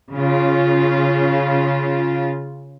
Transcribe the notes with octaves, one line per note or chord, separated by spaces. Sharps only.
C#3 F4